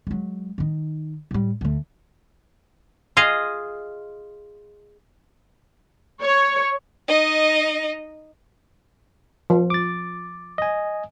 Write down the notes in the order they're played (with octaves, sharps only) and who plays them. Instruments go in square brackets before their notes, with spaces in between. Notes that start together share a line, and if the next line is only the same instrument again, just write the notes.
[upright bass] F#3 G#3
D#3 D#4
A2 G3
D2 A3
[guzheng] F4 G#4 D#5 F5
[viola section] C#5
[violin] D#4 D#5
[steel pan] F3
[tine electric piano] D6 A6
D#5 G#5